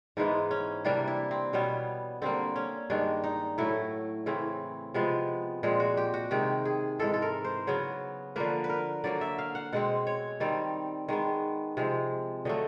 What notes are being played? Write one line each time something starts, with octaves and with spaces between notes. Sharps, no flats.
G#2 E3 G#3 B3 D#4
C#4
C3 E3 G3 A#3 D4
E4
C4
B2 G3 B3 C#4
D3 G3 A#3 C4
C#4
G2 D#3 G#3 D4
D#4
A2 F#3 A3 E4
C#3 E3 A3 C4
C3 F3 G#3 B3
A#2 F3 G#3 C4
F#4
G4
F#4
C3 D#3 G#3 G4
G#4
G#2 E3 G#3 A4
A4
A#4
C5
C#3 F#3 B3
D3 F3 A#3 B4
B4
A#4
D3 F#3 A#3 D5
E5
F5
F#5
B2 G#3 C4 F#5
C#5
D#3 G3 C4 D5
D#3 G#3 B3
C3 F3 G#3
D3 F#3 A3 D#5